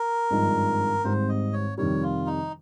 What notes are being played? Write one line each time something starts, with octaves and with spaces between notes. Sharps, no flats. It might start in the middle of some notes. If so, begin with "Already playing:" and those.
Already playing: A#4
G#1 G2 F3 G#3 D#4
G#1 G#2 G3 C4 C5
D#5
C#5
F2 C3 D#3 G3 C#5
F4
D#4